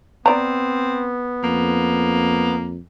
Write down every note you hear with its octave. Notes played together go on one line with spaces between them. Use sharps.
B3 C4 D5 A#5
F2 A#3